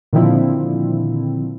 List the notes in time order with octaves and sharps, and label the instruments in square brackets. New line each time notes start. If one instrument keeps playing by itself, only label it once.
[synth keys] A#2 D3 D#3 F3 C4 E4